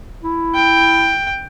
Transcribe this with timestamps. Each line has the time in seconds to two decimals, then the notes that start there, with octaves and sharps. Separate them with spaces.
0.23 E4
0.55 G5